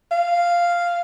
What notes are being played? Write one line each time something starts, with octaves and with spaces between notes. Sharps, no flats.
F5